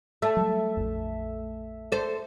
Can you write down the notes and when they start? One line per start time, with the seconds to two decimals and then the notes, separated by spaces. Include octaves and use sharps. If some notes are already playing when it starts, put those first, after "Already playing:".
0.22 A3 E5 A5
0.37 F#3 G3
0.77 A#1 F2
1.92 A4 C5